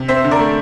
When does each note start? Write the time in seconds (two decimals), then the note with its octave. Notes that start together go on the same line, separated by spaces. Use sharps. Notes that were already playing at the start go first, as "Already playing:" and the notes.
Already playing: C3
0.08 C4 C5 E5
0.24 D3
0.31 A#4 D5
0.39 A3